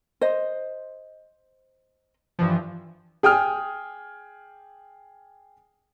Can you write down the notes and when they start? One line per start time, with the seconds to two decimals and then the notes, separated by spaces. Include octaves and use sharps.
0.21 C5 D#5
2.39 G2 E3 F3
3.23 G#4 G5 D#6 F6